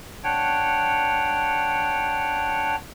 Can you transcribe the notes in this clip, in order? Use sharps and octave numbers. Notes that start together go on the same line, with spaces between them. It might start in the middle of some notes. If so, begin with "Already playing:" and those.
D4 C#5 F#5 G5